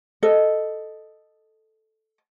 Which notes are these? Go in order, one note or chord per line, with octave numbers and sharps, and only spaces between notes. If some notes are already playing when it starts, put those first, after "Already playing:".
A4 D#5